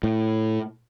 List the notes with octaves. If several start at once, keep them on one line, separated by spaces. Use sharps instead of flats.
A2